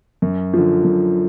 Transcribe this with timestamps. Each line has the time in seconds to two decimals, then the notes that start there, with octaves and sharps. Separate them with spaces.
0.22 F#2
0.54 D3 F3
0.84 F#2